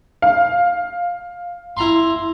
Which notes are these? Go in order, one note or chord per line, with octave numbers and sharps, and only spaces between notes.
F5
E4 A#5 C6